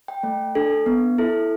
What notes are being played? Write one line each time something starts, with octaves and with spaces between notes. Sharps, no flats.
G5
A3
D4 A4
B3
E4 A4